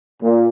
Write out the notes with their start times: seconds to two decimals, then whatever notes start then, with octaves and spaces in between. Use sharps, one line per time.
0.21 A#2